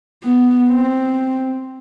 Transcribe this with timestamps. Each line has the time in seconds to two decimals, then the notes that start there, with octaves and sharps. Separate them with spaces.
0.24 B3
0.70 C4